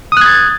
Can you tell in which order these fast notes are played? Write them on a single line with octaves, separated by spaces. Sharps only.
D#6 F#6 G#6 A6